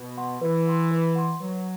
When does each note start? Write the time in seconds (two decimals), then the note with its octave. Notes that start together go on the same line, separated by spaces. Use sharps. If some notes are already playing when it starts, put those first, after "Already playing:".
Already playing: B2
0.17 F#5 C6
0.41 E3 B4
0.66 F#5 C6
0.91 B4
1.15 F#5 C6
1.40 F#3 B4